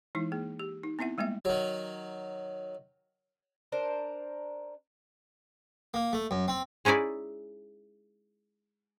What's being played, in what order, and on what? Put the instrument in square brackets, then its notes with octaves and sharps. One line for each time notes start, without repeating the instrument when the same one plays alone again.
[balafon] E3 G#3 D#4 E4
A#3 G#4
G4
D#4
B3 C4 E4 E5 F#5
G3 G#3 A#3 B3 E5
[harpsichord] D#3 F#3
[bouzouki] D4 A#4 C5
[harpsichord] A#3
A3
F#2
C4
[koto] G#3 C#4 D#4 E4 D5